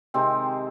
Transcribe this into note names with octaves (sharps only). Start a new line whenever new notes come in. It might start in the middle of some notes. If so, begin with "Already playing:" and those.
C3 D#3 G#3 C4